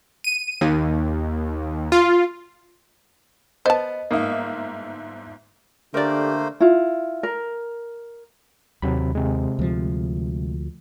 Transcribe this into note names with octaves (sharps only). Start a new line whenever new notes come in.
D#7
D#2
F4
B3 C5 D#5 A5
G1 G#2 A#3 D#4 E5
D3 A3 A#3 G4 A#4 C5 D5
E4 F4
A#4
D#2 C3 F#3 B5
C3 G#3
D2 F3